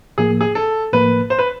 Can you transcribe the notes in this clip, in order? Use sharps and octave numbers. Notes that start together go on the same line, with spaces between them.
A2 F3 A#3 G#4
G#4
A4
A2 F3 A#3 B4
C5
B4